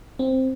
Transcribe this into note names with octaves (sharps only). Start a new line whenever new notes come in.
C4